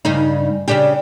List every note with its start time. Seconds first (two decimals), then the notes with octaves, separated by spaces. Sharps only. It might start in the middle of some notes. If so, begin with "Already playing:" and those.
0.05 G2 C#3 D#4
0.68 C#3 D4 G4